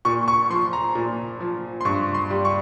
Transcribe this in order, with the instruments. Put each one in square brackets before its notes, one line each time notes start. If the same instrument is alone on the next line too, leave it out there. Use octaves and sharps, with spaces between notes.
[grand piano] A#2 C#6
C#6
F3 C6
A#5
A#2
F3
C6
G2 C#6
C6
G3
C#6